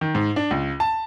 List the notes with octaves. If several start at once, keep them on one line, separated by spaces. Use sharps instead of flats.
D#3
G#2
D4
C#2
A5